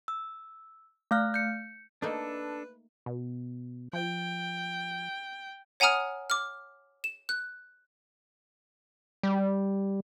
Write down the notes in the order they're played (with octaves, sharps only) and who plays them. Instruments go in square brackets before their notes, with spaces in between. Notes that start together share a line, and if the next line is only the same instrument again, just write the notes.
[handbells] E6
A3 F5 F6 F#6
G6 C#7
[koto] A3 A#3 D#4 [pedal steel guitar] D4 A4 [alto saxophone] B4
[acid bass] B2
[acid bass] F3 [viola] G5
[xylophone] C#5 F#5 G#5 A#5 D#6 F6
D6 F6
E7
F#6
[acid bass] G3